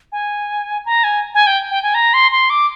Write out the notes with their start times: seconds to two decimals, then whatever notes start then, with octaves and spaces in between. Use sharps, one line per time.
0.12 G#5
0.86 A#5
1.04 G#5
1.35 G#5
1.47 G5
1.71 G5
1.83 G#5
1.95 A#5
2.14 C6
2.32 C6
2.50 D6